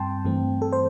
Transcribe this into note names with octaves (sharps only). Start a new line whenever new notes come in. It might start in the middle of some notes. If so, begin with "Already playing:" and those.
Already playing: G2 G3 C4 G5 A5 C6
G2 E3 A3 C4
A4
C5